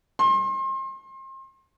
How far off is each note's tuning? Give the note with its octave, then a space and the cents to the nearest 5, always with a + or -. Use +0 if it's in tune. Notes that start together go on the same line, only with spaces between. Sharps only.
C6 +35